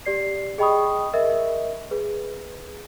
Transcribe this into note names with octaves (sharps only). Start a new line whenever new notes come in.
G4 D5 C7
G#4 D#5 G5 B5 C#6 D#6
A#4 D#5 E5
G#4 B4